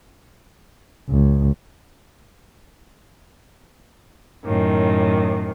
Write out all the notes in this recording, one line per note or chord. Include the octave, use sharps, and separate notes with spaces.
C#2
F#2 A2 D#3